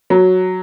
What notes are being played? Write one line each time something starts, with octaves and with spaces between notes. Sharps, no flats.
F#3